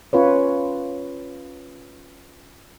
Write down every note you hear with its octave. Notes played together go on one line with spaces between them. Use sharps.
C#4 F4 B4 C#5